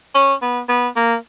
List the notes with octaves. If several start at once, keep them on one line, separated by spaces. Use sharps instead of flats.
C#4
B3
B3
A#3